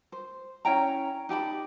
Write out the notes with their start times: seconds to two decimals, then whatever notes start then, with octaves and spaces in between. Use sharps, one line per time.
0.12 C5
0.65 C#4 E4 G5 A#5
1.29 D#4 G4 A5 B5